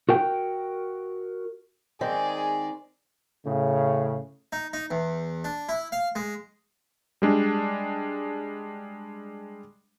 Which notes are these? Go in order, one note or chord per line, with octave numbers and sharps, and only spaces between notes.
F#4 A#4 G5
D#3 G#3 C4 G#4 D5
A2 C#3
D#4
D#4
E2
D4
E4
F5
G#3
G3 G#3 D4